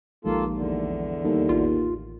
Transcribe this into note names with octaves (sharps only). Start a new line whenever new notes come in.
A#1 D#2 F3 G#3 A#3 F4 A4
E2 D3
D#2 G3 D#4 A4
A1 F4